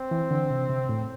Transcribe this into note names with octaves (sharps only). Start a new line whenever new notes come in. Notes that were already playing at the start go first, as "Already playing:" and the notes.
Already playing: C4
E3
D3
C3
C3
A2